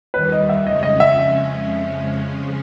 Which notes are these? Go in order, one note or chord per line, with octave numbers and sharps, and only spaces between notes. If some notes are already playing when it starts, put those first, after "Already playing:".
D#2 D#3 G3 B4
D#5
E5
F2 C#3 F3 G#3 C#4 D#5
D#5
E5